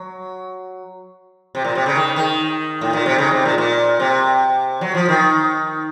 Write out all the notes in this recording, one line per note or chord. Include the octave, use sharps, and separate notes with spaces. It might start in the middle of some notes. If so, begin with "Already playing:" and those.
Already playing: F#3
C3
A#2
C3
C#3
D#3
D#3
A2
A#2
C3
C#3
C3
A#2
A#2
C3
F#3
F3
D#3